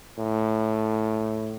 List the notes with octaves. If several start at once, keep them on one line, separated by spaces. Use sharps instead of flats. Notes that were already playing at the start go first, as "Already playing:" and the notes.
A2